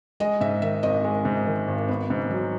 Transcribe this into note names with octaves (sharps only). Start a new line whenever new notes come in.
G#3 D#5
G#2 E5
D#3 E5
G#1 D#5
G#3
G#2
D#3
G#1
B3
G#2
F#3